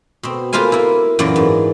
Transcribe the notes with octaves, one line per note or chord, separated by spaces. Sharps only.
B2 C4
A#3 F4 B4 C5 F5 G#5
A#3 E4
F#2 A#2 E3 F#3 A#3 D5
G#2